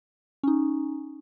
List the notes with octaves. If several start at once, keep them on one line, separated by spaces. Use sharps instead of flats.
C#4 D#4